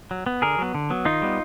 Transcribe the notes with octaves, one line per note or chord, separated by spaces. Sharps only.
F#3
B3
D3 G#4 A#4
F#3 B3
D3
F#3 B3
D#3 D#4 F4
G3 B3